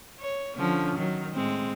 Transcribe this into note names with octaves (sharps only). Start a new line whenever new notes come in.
C#5
D3 F3 C#4
D#3 F#3
A2 G#3 C4